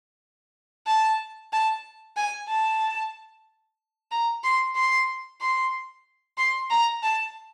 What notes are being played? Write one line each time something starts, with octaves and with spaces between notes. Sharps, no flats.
A5
A5
G#5
A5
A#5
C6
C6
C6
C6
A#5
A5